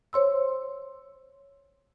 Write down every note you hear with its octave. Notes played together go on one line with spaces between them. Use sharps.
C5 C#5 C6 E6